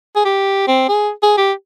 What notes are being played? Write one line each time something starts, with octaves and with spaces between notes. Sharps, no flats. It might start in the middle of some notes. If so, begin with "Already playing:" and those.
G#4
G4
C4
G#4
G#4
G4